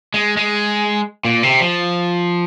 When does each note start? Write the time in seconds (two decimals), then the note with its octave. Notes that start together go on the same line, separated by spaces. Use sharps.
0.14 G#3
0.37 G#3
1.25 A#2
1.43 C3
1.61 F3